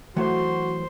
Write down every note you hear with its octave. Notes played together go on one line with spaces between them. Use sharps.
E3 F#3 A3 F#4 C5